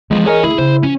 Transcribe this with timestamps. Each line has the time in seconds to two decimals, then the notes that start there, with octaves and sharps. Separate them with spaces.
0.11 E2 E3 F3 G#3
0.26 G#4 A#4 C#5 D#5 G#5
0.44 D2 E4 G#4
0.58 C#3 C5
0.83 F3 C#4